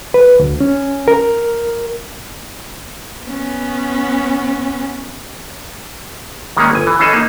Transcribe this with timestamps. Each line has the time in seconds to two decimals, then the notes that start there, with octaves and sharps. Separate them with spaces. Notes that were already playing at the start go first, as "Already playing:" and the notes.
0.14 B4
0.39 D2
0.61 C#4
1.08 A#4
3.25 B3 C#4
6.57 D#3 G3 G#3 A#3 C#4
6.73 G1 G#5
6.87 E3
6.99 E3 C#4 G#4 A4 D#5
7.13 A#3 D#4